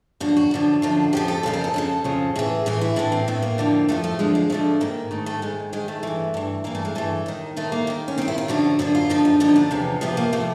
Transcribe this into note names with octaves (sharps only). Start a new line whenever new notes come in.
F#2 D3 F3 F#4
F#4
F#2 D3 F3
F#2 D3 F3
F2 C#3 F3 G4
A4
F2 C#3 F3 C5
A#4
A4
F2 C#3 F3
F2 C#3 F3
A2 E3 G#4
A2 E3 G#4
E4
A2 E3 D4
C4
A2 E3 B3
A#3
F2 D3 F3
F2 D3 F3 A3
A3
F2 D3 F3 G#3
G#3
F2 D3 F3 A3
G#2 D#3 A#3
G#2 D#3 A3
A3
G#2 D#3 G#3
G#2 D#3 G#3
A3
G2 E3
G2 E3
G2 E3 A#3
A3
G#3
G2 E3 A3
D#2 D#3
D#2 D#3 A3
A#3
D#2 D#3
C#4
D#2 D#3 C4
E4
F4
F#2 D3 F3 F#4
F#2 D3 F3 F#4
F4
F#2 D3 F3 D#4
D#4
F#2 D3 F3 D#4
D4
E2 C3 F3 C#4
E2 C3 F3 B3
A#3
C3 F3 A3